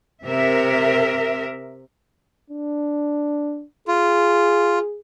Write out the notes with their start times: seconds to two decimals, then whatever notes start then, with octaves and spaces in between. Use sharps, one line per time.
0.23 C3 A#4 E5
2.50 D4
3.88 F4 G#4